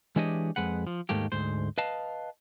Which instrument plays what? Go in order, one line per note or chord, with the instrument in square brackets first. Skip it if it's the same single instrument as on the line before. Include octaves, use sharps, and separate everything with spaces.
[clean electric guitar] E3 G#3 D4 G4 C#5 D#5
F2 G#3 B4 F#5
F3
D#2 G#2 A3 A#3 G4
D2 G#2 C5
B4 D#5 F5 A5